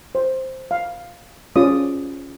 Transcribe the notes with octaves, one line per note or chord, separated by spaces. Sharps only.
C5
F5
C#4 F4 G#4 D5 D#6